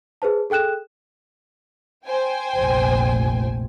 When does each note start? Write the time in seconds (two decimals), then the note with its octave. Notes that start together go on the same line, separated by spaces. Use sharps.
0.22 G#4 B4 C5 A5
0.50 G#4 A4 G5 F#6 E7
2.06 C5 G5 G#5
2.57 F1 A#1